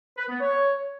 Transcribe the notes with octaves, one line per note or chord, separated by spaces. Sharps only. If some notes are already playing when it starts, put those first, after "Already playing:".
B4
B3
C#5